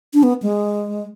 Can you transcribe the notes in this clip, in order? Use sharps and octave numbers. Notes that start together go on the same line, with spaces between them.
D4
B3
G#3